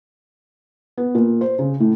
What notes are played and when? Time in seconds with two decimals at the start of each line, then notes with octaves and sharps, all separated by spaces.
0.98 B3
1.15 A#2
1.41 C5
1.59 C#3
1.80 A2